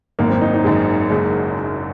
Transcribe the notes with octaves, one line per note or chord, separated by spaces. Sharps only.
G#1 F#2 D#3 A#3
C4
D#4
D#4
G#1 F#2 D#3 G#4
F#1 F#2 C#3 G#3